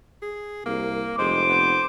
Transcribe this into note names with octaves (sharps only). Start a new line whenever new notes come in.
G#4
C2 A#3
F1 G#3 C5 D6
B3